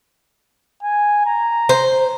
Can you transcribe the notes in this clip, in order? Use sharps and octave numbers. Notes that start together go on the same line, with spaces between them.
G#5
A#5
C5